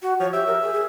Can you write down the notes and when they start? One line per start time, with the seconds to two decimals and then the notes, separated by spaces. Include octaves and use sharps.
0.02 F#4
0.20 F3 C#5
0.33 G4 E5
0.47 A#4
0.62 G#4
0.74 G#4